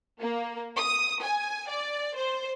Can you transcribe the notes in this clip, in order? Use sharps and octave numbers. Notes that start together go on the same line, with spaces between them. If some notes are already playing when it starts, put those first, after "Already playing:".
A#3
D#6
G#5
D5
C5